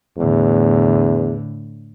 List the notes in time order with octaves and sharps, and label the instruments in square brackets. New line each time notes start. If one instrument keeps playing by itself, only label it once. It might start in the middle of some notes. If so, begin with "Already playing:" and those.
[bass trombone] E2 [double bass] A2 D3